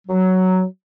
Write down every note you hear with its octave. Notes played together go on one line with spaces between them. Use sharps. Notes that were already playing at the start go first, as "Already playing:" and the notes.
F#3